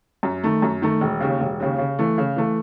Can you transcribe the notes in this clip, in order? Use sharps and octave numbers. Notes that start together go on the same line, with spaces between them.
F#2
D#3 A3
F#2
D#3 A3
E1
D#2 C#3
E1
D#2 C#3
C#3
E3 A3
C#3
E3 A3